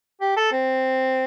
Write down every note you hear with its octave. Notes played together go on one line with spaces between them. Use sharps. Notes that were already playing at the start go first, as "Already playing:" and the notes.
G4
A4
C4